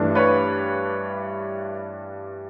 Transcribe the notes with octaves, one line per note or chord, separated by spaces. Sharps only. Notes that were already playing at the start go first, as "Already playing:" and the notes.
Already playing: G2 E3 A3 D4
B4 C#5